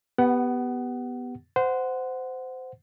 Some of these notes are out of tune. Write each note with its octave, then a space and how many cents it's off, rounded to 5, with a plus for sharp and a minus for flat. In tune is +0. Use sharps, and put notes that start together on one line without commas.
B3 +0 G4 +0 F#5 +25
C5 -20 F#5 +0